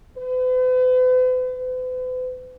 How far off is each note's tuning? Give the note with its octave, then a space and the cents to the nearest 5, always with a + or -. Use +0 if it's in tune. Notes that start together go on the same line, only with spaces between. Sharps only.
B4 +45
B4 +45